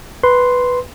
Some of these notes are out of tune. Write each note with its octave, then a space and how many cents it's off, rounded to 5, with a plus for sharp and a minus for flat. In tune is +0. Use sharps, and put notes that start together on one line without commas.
B4 +0 C6 +0